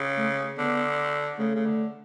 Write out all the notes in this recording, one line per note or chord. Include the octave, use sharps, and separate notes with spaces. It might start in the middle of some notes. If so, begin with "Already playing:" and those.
Already playing: C#3
A3
D3 B3
C#3 A3
C#3
D3